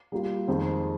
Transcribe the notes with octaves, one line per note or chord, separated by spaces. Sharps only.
G3 A#3 F4
F2 D#3 G#3 C4